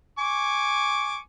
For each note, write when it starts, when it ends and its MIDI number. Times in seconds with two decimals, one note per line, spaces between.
0.18 1.18 80
0.18 1.18 85
0.18 1.18 86